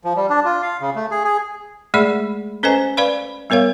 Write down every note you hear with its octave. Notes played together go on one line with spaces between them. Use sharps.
F3
G3
D4
F4
F5
C#3
A3
G#4
G#4
G#3 A3 G#4 D5 E5 B5
C#4 A4 B4 C5 D#5 G#5
B4 D5 F5 B5
G3 B3 A#4 C#5 F5